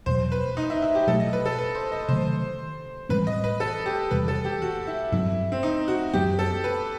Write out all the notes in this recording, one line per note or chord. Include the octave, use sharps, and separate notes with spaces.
E2 B2 F#3 C5
B4
D#4
E4
E4
G4
B2 F#3 A3 A4
D#5
B4
A4
B4
C5
D#5
C3 D#3 F#3 A3 C5
A2 E3 G3 C4 B4
D#5
B4
A4
G4
E2 C3 E3 G3 B4
A4
G4
F#4
E4
G2 F#3 C4 E4
C4
D#4
F#4
F#2 F#3 B3 G4
A4
B4